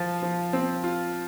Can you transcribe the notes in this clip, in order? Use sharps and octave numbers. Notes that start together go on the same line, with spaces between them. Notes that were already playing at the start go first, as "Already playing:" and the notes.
Already playing: F3 F4
F3
C4
F4